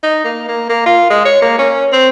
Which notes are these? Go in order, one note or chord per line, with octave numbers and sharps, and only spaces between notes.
D#4
A#3
A#3
A#3
F4
G#3
C#5
A#3
C#4
C4